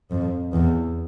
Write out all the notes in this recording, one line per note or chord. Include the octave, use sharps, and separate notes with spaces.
F2
E2